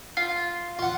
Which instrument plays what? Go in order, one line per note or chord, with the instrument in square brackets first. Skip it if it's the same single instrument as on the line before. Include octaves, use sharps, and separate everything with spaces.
[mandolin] F4
[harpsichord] F4 F#5